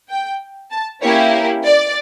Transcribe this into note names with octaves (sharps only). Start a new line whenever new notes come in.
G5
A5
A#3 C#4 E4 G4 C#5
A#4
D5